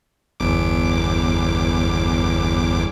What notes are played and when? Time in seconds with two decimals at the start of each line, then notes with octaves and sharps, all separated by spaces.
0.40 G1 E2 D6